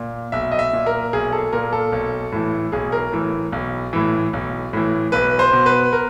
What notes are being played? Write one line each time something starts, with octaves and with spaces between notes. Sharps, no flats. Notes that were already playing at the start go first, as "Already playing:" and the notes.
Already playing: A#2
B1 E5
D#5
E5
A#2
A#4
B1 G#4
A4
A#2 A#4
A4
B1
A2 E3
B1 G#4
A#4
A2 E3
B1
A2 E3
B1
A2 E3
B1 B4
C5
B2
B4
A#4